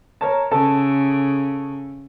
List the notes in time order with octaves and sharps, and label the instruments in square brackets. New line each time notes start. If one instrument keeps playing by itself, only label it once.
[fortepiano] A#4 C#5 A5
[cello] C#3 [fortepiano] A4 A5